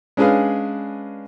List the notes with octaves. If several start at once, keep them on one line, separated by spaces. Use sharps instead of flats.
G#3 C#4 D4 G#4 B4 F5